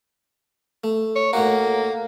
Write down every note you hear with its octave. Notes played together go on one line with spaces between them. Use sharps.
A3
C#5
A2 A#3 D#4 F#4